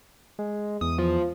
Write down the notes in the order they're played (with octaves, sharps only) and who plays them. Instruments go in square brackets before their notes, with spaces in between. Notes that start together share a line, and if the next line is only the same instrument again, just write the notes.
[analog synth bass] G#3
[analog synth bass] E2 [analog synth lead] D#6
[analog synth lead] F3